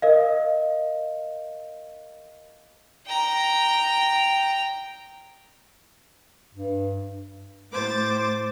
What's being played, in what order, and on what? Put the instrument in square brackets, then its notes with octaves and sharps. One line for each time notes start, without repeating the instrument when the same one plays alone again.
[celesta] A#4 D#5 F5
[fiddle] G5 A#5
[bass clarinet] G2
[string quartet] A2 C5 D6 A6